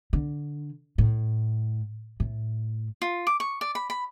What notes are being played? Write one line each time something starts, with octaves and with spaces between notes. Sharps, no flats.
D3
A2
A2
F4
D6
C#6
D5
B5
B5